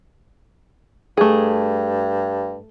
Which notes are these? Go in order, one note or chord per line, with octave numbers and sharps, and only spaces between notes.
G2 A3 G#4